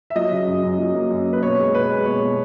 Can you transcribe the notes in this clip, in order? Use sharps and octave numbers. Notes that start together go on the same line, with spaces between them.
E5
F#3 D#5
C#3
F#2
F#2
F#3
A#3
F#2
A#3
B4
B2 C#5
G#3
B2 B4
G#3
B2 C#5
B2